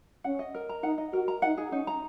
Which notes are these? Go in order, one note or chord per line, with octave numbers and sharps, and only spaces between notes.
C#4 F#5
D#5
A#4
A#5
D#4 F#5
D#5
F#4 A#4
A#5
D#4 F#5
G#4
C#4 D#4
A#5